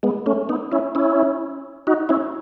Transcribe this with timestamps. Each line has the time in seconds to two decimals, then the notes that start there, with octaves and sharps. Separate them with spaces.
0.03 G#3 B3
0.26 A3 C#4
0.49 B3 D#4
0.72 C#4 E4
0.95 C#4 E4
1.87 D#4 F#4
2.09 C#4 E4